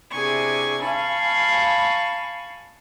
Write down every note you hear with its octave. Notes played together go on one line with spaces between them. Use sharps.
C3 D4 E4 G#4 G#5 C#6
F5 G#5 A5 B5 C#6